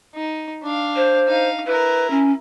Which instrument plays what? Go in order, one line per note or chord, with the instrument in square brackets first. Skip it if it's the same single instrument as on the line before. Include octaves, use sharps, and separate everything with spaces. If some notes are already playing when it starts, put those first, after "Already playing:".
[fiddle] D#4
D4 F5
[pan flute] C5
[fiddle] D#4 F5
[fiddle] E4 A#4 [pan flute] B4
[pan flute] C#4